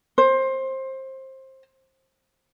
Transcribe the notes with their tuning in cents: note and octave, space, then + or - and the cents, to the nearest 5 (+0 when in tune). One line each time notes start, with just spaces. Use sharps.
C5 +20